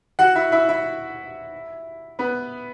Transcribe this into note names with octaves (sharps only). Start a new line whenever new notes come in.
F#4 F#5
E4 E5
E4 E5
E4 E5
B3 B4